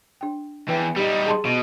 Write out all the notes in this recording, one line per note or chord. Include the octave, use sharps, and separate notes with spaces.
D4 G5
E2 B4 G5
G3 D#4 G4
G#4 A5 C6
B2